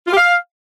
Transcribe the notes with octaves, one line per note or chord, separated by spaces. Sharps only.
F4
G4
F5